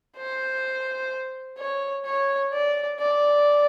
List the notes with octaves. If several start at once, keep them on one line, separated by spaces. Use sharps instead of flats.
C5
C#5
C#5
D5
D5